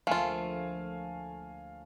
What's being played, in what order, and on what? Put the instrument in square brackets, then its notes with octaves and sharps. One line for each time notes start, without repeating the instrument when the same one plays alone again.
[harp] D2 F3 A#3 [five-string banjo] A3 F4 [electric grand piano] F5 G#5 A5